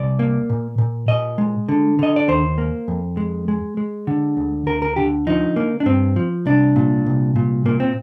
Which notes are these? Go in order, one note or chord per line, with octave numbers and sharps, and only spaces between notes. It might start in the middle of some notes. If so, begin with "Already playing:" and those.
Already playing: C2 D5
A#3
A#2
A#2
A#2 D#5
G#3
D3
D3 D#5
D5
D#2 C5
A#3
F2
G#3
G#3
G#3
D3
D2
D2 A#4
A#4
D3 G4
F3 D#4
A#3
D4
G2 C4
F3
C2 D4
A#2
C2
A#2
A#2 A#3
C4